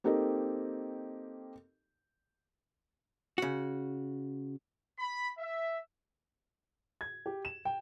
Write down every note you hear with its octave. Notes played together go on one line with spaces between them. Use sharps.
A#3 C4 D#4 G4 A4 D#5
C#3 F#4
B5
E5
G#6
G4
E7
G5